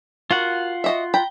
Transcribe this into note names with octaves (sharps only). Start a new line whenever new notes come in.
F4 F#4 A#4 F#5
F#4 D#5 E5
G5 A#5 B5